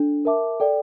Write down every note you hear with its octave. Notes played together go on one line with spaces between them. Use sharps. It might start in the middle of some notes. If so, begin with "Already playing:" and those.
Already playing: D4 A4
A#4 E5 A5 D6
A4 D5 G5